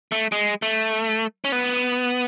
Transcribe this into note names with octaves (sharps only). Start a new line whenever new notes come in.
A3
G#3
A3
C#4
B3